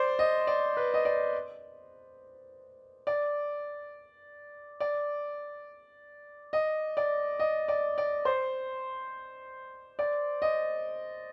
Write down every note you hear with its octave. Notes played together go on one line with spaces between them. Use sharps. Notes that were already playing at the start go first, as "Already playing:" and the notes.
Already playing: C5 D5
D#5
D5
B4
D#5
D5
D5
D5
D#5
D5
D#5
D5
D5
C5
D5
D#5